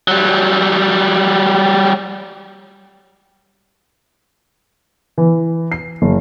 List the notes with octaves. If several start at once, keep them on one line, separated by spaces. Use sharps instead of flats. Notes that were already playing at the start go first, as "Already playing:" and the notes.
F#3 G3
E3
C7
F#1